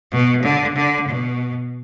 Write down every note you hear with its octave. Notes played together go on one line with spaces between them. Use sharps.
B2
D3
D3
B2